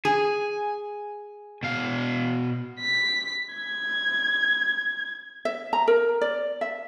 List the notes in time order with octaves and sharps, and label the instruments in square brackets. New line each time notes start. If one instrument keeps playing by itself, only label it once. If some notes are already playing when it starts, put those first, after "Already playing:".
[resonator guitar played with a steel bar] G#4 [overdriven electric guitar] G#5
[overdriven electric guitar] B2 F5
[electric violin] B6
G#6
[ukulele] E5
A#5
A#4
D5
E5